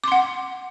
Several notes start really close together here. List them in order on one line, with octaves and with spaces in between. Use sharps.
D6 C6 F#5